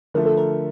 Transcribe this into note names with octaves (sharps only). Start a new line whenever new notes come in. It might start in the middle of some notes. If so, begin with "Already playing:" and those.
D3 F3 A3 A#4
A4
A#4